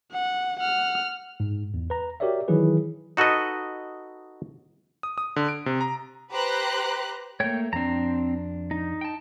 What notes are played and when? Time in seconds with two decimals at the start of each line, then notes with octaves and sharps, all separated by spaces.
0.12 F#5
0.60 F#5 F6
1.40 G#2
1.74 E2
1.90 B4 A#5
2.20 F#4 G4 A#4 C#5 D5 E5
2.48 D#3 E3 F#3 E4 G#4 B4
3.17 D#4 F#4 A4 B4 D#5
5.03 D#6
5.18 D#6
5.36 D3
5.48 D7
5.66 C3
5.81 A#5
6.31 G4 B4 C5 A#5 F#6
7.40 A3 A#3 C#5 G5
7.73 F2 C4 D4 A#5
8.71 D#4
9.01 G5 A5